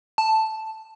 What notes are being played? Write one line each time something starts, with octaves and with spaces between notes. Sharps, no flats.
A5